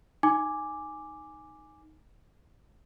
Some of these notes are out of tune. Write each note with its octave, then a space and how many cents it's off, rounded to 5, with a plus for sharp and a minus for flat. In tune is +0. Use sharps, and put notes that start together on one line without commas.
D#4 +0 G#5 +0 D6 +0